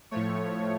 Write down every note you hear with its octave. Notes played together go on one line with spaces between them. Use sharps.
A2 F3 A3 C#5